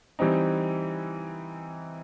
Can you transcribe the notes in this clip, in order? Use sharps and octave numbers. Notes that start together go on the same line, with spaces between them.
E3 G3 C4 D#4